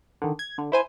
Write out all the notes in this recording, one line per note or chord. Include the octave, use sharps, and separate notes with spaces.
D3 D#3
G#6
D3
E4 C5 G#5